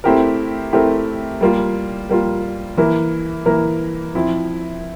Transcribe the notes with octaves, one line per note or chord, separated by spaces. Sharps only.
A3 C4 E4 G4 A#4
A3 C4 E4 G4 A#4
G3 A#3 F4
G3 A#3 F4
E3 A#3 E4 A#4
E3 A#3 E4 A#4
F3 C4 E4